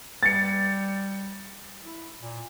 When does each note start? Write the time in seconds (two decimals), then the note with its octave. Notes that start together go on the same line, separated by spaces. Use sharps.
0.23 G3 A6 C#7
1.83 E4
2.22 A#2